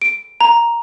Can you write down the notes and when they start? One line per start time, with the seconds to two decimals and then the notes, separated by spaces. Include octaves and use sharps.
0.02 D7
0.41 A#5